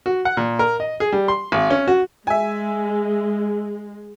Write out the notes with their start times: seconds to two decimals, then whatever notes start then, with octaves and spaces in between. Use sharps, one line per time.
0.06 F#4
0.25 F#5
0.37 A#2
0.59 A#4
0.80 D#5
1.00 G#4
1.12 G3
1.28 C6
1.52 G#1
1.70 C#4
1.88 F#4
2.27 G#3 E5 G#5